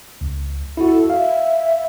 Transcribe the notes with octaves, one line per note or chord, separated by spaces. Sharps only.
C#2
E4 F#4 A4
E5 F5